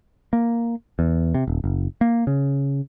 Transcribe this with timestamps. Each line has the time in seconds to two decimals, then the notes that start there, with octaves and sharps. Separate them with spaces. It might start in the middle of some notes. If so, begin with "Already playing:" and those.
0.33 A#3
0.99 E2
1.34 C3
1.48 D#1
1.64 F#1
2.01 A#3
2.27 C#3